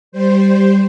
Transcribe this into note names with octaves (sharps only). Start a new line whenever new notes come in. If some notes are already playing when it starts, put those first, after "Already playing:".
G3 C5